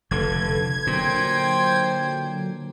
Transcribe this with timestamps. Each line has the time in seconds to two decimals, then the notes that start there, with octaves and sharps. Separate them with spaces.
0.11 F1 D3 A4 B4 G#6
0.87 A#2 D3 F#3 C5 G5